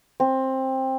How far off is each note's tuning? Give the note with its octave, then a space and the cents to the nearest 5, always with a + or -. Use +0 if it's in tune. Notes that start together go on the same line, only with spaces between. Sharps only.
C4 +15